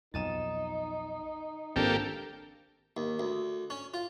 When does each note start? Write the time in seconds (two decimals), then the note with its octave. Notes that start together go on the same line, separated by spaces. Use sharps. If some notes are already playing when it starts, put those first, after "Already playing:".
0.14 B1 F2 D#4 A6 D#7 E7
1.76 G#1 F3 A#3 C4 D4 G4 A4
2.97 D#2
3.19 D2
3.70 C#4
3.94 F4